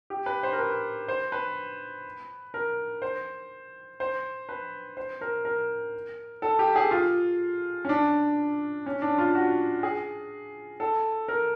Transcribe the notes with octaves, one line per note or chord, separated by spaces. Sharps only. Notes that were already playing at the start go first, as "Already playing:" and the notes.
G4
B4
C5
A#4
B4
C5
B4
A#4
C5
C5
B4
C5
A#4
A#4
A4
G4
G#4
F4
C#4
D4
C#4
D4
F4
F#4
G#4
A4
A#4